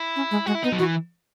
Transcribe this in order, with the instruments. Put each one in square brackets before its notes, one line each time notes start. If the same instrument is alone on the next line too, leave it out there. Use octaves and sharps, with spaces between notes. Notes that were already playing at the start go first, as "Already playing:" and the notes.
Already playing: [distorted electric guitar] E4
[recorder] C#4
G#3
[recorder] G#3 [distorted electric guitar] F#4
[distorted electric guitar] E4
[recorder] B3 [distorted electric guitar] D#4
[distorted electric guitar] F#3
[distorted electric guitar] E3 [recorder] F#4